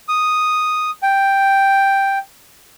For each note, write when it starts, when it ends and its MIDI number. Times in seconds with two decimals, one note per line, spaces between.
0.08 0.90 87
1.03 2.18 79